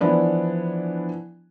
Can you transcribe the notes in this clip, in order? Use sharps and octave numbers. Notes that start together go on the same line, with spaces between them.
E3 F3 B3 D4 E4